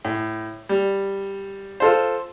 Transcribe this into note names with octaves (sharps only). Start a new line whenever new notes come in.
A2
G3
F4 A4 C5